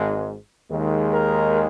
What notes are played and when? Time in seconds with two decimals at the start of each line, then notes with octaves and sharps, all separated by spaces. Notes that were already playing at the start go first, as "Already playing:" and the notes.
Already playing: G#1 G#2 G#3
0.71 D#2 D#3 G#3
1.14 A#4